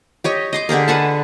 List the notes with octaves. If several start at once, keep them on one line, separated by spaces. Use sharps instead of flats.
G4 C#5 D#5
D#5 C6 D6
D3 G4 G#4 A#4
B4 F#5 G#5 A5